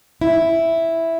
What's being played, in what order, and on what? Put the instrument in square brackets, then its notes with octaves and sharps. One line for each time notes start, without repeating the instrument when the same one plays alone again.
[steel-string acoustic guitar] E4